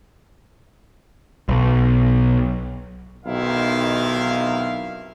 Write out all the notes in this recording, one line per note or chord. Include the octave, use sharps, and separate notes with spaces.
B1
B1 C3 D#3 E4 F5